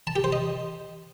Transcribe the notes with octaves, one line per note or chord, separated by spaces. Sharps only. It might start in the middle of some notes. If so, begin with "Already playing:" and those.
A5
G4
C5
D#5